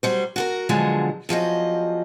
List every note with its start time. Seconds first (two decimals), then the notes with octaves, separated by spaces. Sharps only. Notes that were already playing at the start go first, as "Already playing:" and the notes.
0.03 F#3 G3 C5
0.36 F#4 A4 A#4
0.69 B2 D3 F3 F#3 G#3
1.29 E2 F3 F#3 D#5